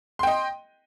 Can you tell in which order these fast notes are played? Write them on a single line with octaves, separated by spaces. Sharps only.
C6 G5 D#5